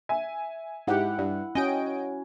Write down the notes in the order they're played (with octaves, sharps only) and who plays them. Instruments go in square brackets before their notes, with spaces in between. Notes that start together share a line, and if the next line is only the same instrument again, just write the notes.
[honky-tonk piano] E5 G#5
[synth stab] G#2 G4 [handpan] E4 F#5
[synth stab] G2
[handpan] C#4 F#4 [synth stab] D#5 G5 D7 [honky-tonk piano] G#5